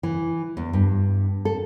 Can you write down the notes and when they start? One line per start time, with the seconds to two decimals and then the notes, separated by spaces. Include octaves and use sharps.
0.03 E3
0.57 E2
0.73 G2
1.45 A4